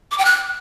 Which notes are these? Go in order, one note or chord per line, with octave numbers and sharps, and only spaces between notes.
D6
G5
F#6